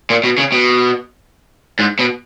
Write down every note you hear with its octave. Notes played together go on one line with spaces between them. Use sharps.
A#2
B2
C#3
B2
G#2
B2